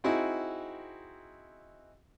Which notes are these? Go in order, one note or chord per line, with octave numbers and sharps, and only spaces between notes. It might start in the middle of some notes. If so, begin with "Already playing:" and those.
C4 D#4 E4 F#4 G#4